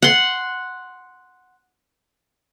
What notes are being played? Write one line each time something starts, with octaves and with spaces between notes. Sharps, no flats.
F#5 C6